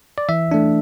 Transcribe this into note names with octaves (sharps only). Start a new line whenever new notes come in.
D5
E3 E5
A3 D4